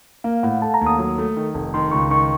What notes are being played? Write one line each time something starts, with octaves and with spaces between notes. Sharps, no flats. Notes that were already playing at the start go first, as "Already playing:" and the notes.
A#3 F5
A2 F#5
A3 A5
A#5
D#2
D#6
F#3
A3
D#3
F1
D#3 C6
C#2 C#6
D#3 C#6